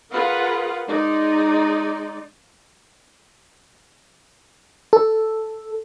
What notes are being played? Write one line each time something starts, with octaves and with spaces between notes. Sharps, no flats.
F4 G#4 A#4 B4 F5 F#5
G#3 D#4 D5
A4